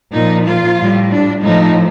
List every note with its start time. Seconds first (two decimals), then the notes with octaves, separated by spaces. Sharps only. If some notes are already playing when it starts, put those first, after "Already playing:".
0.13 A#2 F3 D#4
0.46 F4
0.78 A2 G3
1.11 D4
1.43 A2 F3 D#4